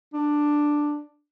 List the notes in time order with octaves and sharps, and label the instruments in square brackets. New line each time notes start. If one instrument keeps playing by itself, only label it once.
[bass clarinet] D4